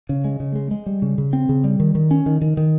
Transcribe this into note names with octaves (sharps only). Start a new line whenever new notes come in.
C#3
G#3
C#3
G#3
G#3
G3
C#3
C#3
C4
C#3
G3
D#3
D#3
C#4
D#3
D#3
D#3